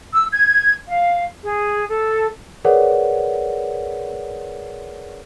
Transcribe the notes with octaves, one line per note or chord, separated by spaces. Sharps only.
E6
G#6
F5
G#4
A4
G#4 A#4 B4 C#5 D5 F#5